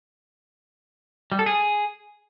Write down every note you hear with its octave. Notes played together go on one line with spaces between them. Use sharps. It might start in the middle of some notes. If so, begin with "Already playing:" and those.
G3
A4
G#4